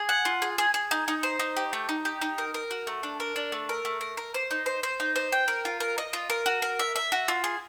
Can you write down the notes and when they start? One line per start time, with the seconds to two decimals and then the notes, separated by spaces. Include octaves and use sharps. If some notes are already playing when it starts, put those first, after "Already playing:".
Already playing: G#4
0.09 F#5
0.25 F4
0.42 G#4
0.58 G#4
0.74 G#4
0.91 D#4
1.08 D#4
1.23 C5
1.39 D#4
1.56 G4
1.73 A3
1.89 D#4
2.05 G4
2.21 D#4
2.38 A#4
2.54 A#4
2.71 F#4
2.87 A3
3.03 D4
3.20 A#4
3.36 D4
3.52 A3
3.69 A#4
3.85 A3
4.01 A#4
4.17 A#4
4.34 C5
4.51 D#4
4.66 C5
4.83 C5
5.00 D#4
5.16 C5
5.32 G5
5.48 A#4
5.65 F4
5.80 A#4
5.98 D#5
6.13 F4
6.30 A#4
6.46 F#4
6.62 A#4
6.79 E5
6.96 E5
7.12 F#4
7.28 F4
7.44 G#4